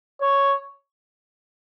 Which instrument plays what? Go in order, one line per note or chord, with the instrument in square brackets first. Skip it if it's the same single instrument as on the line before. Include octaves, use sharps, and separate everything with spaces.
[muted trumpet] C#5